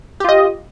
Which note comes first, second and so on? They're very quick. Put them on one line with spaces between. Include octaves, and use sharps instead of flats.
G4 F4 D#5